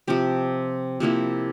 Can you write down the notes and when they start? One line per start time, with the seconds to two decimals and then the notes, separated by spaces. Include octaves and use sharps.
0.07 C3 F3 C4 G4
1.00 C3 F3 A#3 E4